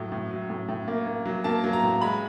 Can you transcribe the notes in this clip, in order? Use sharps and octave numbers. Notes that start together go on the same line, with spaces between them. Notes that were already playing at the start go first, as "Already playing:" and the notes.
Already playing: A2 F#3
A2
F#3
A2
A2
A#3
A#3
F#3
A#3 A5
F#3
A#5
A2
G#3 B5